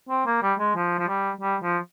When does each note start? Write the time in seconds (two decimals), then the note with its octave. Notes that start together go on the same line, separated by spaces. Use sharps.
0.09 C4
0.26 A#3
0.42 G3
0.59 G#3
0.75 F3
0.99 F3
1.08 G3
1.41 G3
1.63 F3